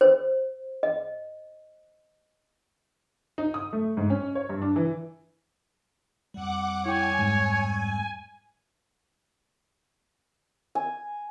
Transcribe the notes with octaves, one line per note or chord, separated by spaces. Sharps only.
C5
D#5
D#4
D#6
A3
G#2
C#4
C#5
G2
D4
E3
F2 G3 F#5 D6
E4 C#5 G5 G#5
G#2
G#5